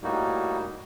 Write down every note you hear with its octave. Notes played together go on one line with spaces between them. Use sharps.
A2 G3 A#3 D#4 F#4